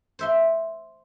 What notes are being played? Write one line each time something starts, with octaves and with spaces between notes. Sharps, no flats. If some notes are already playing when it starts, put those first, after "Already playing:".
C5 E5 C6